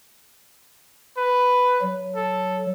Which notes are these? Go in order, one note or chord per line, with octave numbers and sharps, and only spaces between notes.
B4
F#3
A4